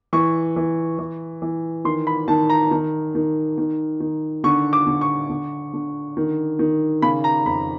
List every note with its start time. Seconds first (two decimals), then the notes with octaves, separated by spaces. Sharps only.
0.13 E3 C#6
0.56 E3
0.99 E3
1.42 E3
1.85 D#3 C6
2.07 B5
2.28 D#3 A5
2.50 A#5
2.71 D#3
3.15 D#3
3.58 D#3
4.00 D#3
4.44 D3 C#6
4.73 D6
4.87 D3
5.01 C#6
5.29 D3
5.73 D3
6.17 D#3
6.59 D#3
7.02 C#3 B5
7.24 A#5
7.45 F2 B5